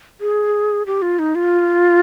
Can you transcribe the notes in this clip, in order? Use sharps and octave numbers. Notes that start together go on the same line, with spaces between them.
G#4
G4
F4
D#4
F4